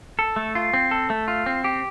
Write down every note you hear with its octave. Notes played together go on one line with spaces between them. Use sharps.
A4
A3
F4
C4
A4
A3
F4
C4
G4